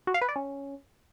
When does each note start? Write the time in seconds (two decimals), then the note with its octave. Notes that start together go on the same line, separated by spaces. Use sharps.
0.07 F#4
0.14 F5
0.21 B4
0.29 D5
0.36 C#4